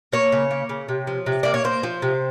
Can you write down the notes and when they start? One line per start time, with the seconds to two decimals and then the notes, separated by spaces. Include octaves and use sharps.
0.13 A#3 C#5
0.32 C#3
0.51 A#3
0.69 C#3
0.89 C3
1.07 F3
1.26 C3
1.43 A#3 D5
1.54 C#5
1.64 A#3 C5
1.83 F3
2.02 C3